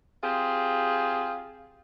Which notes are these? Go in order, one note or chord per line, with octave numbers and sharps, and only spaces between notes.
C4 F4 G4 G#4